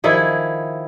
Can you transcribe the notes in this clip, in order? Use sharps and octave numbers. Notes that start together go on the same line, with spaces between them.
D#3 F3 E4 G#4